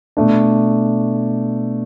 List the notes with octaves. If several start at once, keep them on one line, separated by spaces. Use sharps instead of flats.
B2 A3 D4